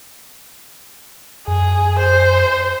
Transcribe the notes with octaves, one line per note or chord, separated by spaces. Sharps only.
F#2 G#4
C5